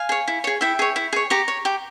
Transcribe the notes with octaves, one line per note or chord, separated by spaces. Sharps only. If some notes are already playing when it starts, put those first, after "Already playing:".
Already playing: F5 G#5
G#4 C#5
E4
G#4 C#5
E4 E5 G5
G#4 C#5
E4
G#4 C#5
G4 A#5 C#6
C#5
G4